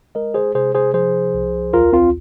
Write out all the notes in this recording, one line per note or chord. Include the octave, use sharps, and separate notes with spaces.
G#3 A#4 D#5
G#4 C5
C3 G#4 C5
G#4 C5
F3 G#4 C5
C2
D#2 F4 A#4
C4 F4